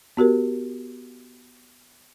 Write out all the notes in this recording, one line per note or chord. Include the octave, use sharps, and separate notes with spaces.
B3 F#4 G4 A#4